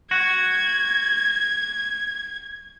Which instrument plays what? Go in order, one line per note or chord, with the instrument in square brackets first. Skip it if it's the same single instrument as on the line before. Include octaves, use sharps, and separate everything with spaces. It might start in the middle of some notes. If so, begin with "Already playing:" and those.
[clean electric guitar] F#4 [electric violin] G#6